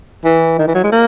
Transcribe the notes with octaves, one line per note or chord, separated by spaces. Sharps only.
E3
D#3
E3
F#3
G#3
A#3